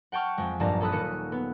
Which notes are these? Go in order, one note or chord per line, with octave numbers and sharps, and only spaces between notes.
F#5 G5 A5 C#6 F6
F2 G#3
A#1 G2 G3 F5 A5 A#5
C#4 A4 A5 B5 D#6 F#6
D#1 A#3 A4 C#7
B3